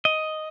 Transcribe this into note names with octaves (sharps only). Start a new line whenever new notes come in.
D#5